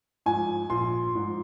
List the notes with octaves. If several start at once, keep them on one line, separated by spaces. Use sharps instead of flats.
G#2 F3 G#5
A#1 C6
G#2 F3